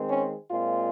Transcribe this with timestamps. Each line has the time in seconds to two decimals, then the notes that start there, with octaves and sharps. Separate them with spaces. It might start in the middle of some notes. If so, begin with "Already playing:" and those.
Already playing: D#3 G#3 C4
0.09 C#4
0.49 A#2 G#3 C4 F4